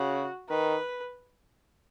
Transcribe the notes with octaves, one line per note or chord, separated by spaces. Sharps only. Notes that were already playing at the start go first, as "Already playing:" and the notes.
Already playing: C#3 F#4
D#3 B4